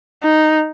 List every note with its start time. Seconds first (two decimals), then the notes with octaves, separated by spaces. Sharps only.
0.23 D#4